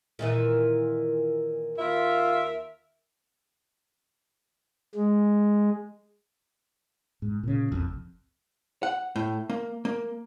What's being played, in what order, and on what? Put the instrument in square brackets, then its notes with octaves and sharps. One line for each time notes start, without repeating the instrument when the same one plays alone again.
[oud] A#2 D#3 E3
[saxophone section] D#2 A#4 E5 [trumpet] F4
[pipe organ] G#3
[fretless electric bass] G#2
A#2 C#3
F#1 C2 F2
[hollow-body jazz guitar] F#5
A2
A#3
A#3